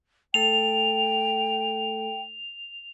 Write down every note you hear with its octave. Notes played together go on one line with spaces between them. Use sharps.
A3 A4 G5 F7